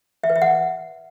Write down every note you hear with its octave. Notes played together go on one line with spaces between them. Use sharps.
E5
B4
E5
F#5